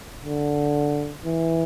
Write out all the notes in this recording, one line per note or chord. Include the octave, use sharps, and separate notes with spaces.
D3
E3